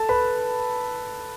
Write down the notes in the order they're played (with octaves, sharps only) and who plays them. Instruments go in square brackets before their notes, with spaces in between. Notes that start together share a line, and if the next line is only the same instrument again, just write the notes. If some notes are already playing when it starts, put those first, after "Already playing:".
Already playing: [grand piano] A4 A5
B4 B5